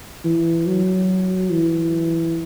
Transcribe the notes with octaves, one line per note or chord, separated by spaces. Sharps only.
E3
F#3
E3